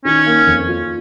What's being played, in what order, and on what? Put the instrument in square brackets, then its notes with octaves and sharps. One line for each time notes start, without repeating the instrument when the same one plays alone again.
[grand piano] D#3 [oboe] C#4
[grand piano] A#3
F2
F4